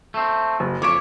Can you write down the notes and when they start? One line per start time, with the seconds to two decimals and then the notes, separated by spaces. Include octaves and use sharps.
0.14 A3 C4
0.60 F#1
0.82 F2 C#5 D6 D7